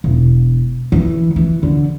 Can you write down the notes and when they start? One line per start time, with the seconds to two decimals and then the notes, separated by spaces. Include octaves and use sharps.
0.04 E1
0.92 E3
1.36 E3
1.63 D3